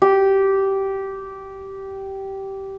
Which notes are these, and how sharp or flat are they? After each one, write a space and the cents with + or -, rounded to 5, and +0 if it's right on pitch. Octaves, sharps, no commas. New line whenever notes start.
G4 -15